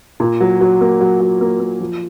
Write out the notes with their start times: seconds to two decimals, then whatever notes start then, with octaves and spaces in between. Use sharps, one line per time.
0.20 A#2
0.41 F#3
0.61 F#3
0.81 A#3
1.01 F#3
1.20 F#3
1.41 A#3
1.60 A#3
1.80 F3